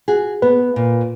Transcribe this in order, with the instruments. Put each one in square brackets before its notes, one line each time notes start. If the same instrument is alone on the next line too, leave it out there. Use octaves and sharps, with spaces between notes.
[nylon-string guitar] F#4 G#4
[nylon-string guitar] B3 [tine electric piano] B4
[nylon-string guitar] A#2